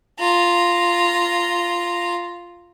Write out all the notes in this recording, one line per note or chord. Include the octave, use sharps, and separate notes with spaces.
F4 A#5